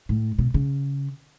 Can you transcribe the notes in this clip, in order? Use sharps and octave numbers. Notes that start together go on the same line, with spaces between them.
A2
B2
C#3